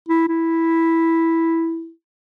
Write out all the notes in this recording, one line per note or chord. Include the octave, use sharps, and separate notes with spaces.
E4
E4